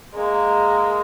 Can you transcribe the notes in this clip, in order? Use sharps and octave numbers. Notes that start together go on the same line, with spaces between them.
G#3 A#3